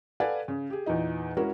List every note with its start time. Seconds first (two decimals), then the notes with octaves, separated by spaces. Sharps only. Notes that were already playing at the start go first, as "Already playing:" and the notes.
0.20 A4 B4 D5 F5 F#5 G#5
0.48 C#3
0.70 G4 G#4
0.86 E2 A#2 D#4 D#5
1.37 G#3 C#4 E4 F#4 G#4 A#4